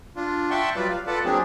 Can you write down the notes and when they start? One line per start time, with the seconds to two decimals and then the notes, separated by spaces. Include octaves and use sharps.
0.16 D4 F4
0.51 E5 F#5 G5 A5 C6 C#6
0.76 F#3 G3 F4 B4 D5
0.89 F5
1.07 F4 A4 B4 D5 F#5 A5
1.25 F#3 A#3 C4 D4 G4 G#4